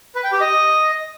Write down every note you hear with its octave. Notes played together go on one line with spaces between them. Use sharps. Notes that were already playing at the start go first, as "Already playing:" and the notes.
B4
G5
G4
D#5